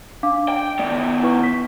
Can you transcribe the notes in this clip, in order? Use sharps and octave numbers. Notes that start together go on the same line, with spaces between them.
D4 F5 D6
G5
D#3 B3 D5
E4 B4 C#6
B6